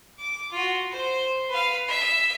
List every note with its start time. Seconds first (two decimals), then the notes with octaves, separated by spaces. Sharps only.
0.18 D6
0.52 F4 F#4
0.91 C5
1.49 B4 F5
1.88 E5